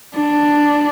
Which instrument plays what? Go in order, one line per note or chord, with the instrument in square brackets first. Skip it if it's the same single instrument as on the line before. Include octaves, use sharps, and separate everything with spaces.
[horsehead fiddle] D4